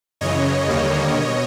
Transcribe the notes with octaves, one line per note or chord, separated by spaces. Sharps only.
F#2 C#3 E3 C#5 D#5
D#2 D3 G3 A#3
B2